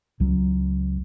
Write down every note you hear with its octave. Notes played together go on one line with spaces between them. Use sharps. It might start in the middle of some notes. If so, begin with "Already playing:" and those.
C#2 F#3